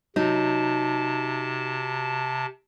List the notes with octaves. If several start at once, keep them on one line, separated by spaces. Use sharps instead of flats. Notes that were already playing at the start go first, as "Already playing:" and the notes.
C3 F#3 D#4 A5